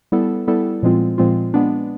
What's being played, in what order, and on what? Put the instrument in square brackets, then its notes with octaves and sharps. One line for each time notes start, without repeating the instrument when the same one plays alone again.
[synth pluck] G3 B3 E4 A4
G3 B3 E4 A4
A#2 F3 G#3 C4 F4
A#2 F3 G#3 C4 F4
G#3 B3 D4